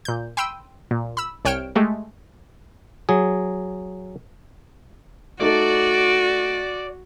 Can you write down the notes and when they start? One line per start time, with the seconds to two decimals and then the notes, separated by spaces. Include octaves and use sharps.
0.05 A#2 G6
0.37 G5 B5 C6 E6 D#7
0.91 A#2
1.17 B5 E6
1.45 C2 C#5 G5 F6 D7 E7
1.76 G#3 A3 G4
3.09 F#3 G#4
5.40 A3 D#4 F#4 A4 D5